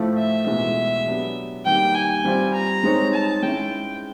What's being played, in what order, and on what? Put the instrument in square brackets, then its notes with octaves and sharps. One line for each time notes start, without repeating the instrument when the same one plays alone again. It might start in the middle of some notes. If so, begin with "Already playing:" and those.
Already playing: [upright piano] A2 F3 A3
[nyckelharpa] E5
[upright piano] E2 B2 G#3 [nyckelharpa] E5
[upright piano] F#3 B3 D4 G4
[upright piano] D#3 G3 A#3 [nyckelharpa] G5
[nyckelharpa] G#5
[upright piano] G3 C4 F4
[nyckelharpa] A#5
[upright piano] G#3 C4 D#4 G#4 C#5
[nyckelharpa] A5
[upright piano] G#3 C#4 E4 [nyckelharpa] G5